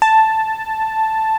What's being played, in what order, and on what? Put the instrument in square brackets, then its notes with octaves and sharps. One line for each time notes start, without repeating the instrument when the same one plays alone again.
[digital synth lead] A5